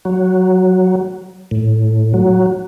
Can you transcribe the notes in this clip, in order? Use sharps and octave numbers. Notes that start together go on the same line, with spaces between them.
F#3
A2
F#3